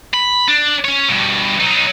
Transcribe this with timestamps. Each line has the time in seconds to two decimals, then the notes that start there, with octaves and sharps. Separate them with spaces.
0.14 B5
0.48 D4
0.85 C#4 C#5
1.09 G2 B2
1.60 F#3 D#4